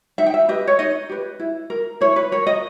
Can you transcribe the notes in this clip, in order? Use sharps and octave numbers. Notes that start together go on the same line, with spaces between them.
D#4 E5
G5
E5
G4 B4 D#5
C#5
D#4 D#5
G4 B4
E4
A#4
E4 C#5
B4
A#4 C#5
D#5